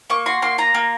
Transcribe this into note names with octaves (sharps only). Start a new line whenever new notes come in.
A#3 C#6
F#4 C6
A#3 C6
F4 A#5
A#3